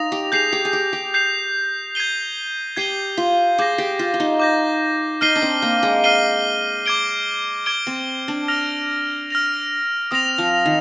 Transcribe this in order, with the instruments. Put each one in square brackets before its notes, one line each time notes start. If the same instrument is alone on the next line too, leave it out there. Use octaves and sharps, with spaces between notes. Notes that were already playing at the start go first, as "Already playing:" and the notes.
Already playing: [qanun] D#4 F4 [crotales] D#6 A#6 F7
[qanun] G4
[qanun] G#4 [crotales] G6 C7 F7
[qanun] G4
G#4
G4
G4
[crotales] G6 C7 F7
G#6 C7 D#7 G7
[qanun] G4 [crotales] G#6 C7 D#7 G7
[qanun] F4
[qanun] G#4 [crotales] D6 G6 A#6
[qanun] G4
F4
F4
D#4
[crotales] D6 G6 A#6
[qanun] D#4 [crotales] F6 C7 D#7 G7
[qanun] D4
C4
A#3
G#3
[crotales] F6 C7 D#7 G7
D6 G#6 D7 G7
D6 G#6 D7 G7
[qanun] C4
D4
[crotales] F6 A#6 F7
F6 A#6 F7
[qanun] C4 [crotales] D#6 A#6 F7
[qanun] F3
D#3